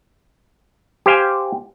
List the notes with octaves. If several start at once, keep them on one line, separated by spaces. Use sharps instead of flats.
G4 C5 F5 G5 G#5